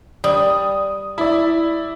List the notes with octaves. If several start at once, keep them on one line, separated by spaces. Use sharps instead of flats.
G3 D#6
E4 D5